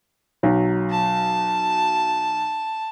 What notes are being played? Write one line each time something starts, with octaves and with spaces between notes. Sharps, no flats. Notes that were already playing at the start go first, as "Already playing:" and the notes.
B1 F#3
A5